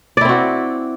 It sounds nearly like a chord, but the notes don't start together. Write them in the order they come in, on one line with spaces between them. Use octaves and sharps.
D5 E4 C4 F#4